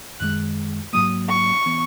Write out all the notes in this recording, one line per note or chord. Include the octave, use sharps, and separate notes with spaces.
F#2 D#3 G#3 F#6
G#2 F#3 A#3 D#6
C#6
E3 B3